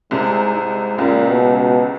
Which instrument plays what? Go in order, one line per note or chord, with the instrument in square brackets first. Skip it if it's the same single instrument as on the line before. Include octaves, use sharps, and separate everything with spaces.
[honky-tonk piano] C2 C3 [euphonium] G#2
[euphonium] G#2
[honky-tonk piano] C#2 C#3 [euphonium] A#2
[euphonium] B2
B2